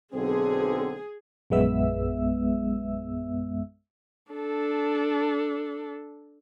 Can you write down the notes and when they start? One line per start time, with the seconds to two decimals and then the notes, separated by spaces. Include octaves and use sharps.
0.13 B1 D3 C4 G#4
1.50 A#1 F#2 G#3 B3 E5 E6
4.32 D4 A4